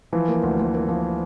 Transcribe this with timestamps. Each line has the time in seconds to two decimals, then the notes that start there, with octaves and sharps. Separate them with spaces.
0.13 E3 F3
0.28 A#3
0.43 D2
0.59 A#3
0.74 A#3
0.88 F3